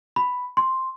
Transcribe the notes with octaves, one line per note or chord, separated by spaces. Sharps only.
B5
C6